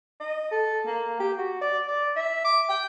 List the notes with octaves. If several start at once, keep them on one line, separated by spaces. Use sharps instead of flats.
D#5
A4
A#3
G4
F#4
D5
D5
E5
D6
G5